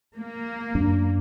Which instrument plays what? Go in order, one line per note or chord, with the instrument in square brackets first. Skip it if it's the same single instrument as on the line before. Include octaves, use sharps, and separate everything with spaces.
[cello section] A#3
[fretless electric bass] F#2 D4